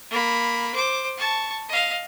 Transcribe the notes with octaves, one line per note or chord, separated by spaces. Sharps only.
A#3 B5
C5 D6
A5 C#6
D#5 F5